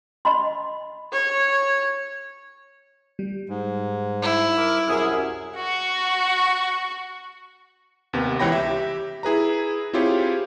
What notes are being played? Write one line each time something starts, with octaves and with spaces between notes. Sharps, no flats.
D#5 B5 C6
C#5
G3
G#2
E4
A#4 D6
C2 F#2 C#4 G#4 G#5 D#6 F6
F#4 C#6
D#2 C3 B3
C#2 E3 C#5 G5 B5 A#6
G4 E5
E4 G#4 B4 A#5
C4 E4 F4 G4 G#4 C#5